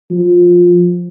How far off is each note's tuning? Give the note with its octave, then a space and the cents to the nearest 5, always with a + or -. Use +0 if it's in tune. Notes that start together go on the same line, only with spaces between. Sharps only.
F3 +15